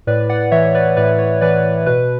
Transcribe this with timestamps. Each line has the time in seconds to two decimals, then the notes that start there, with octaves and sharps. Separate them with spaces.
0.07 A2 B4 D5
0.29 D5 F#5
0.51 E3 C#5 E5
0.75 B4 D5
0.97 A2 B4 D5
1.19 C#5
1.41 E3 B4 D5
1.86 B2 B4